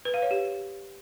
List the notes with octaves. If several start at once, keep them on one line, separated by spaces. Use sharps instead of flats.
B4
F5
C#5
G4